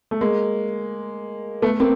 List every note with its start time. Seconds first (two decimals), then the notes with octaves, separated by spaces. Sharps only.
0.11 A3
0.21 G#3 A#3
1.62 A3 B3
1.80 A#3 C4